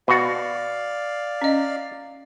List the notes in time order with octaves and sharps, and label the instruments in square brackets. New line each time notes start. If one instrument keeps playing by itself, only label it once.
[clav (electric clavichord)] B2 F#4 [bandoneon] D5 F5
[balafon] C#4 D#5